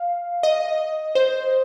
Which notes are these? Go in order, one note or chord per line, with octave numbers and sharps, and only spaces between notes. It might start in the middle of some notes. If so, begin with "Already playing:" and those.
Already playing: F5
D#5
C5